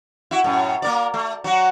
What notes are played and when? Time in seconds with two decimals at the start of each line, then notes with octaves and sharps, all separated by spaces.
0.31 E4 F#4
0.44 F#2 A2
0.82 A#3 A#4 D5
1.14 A3
1.44 F#3 F#4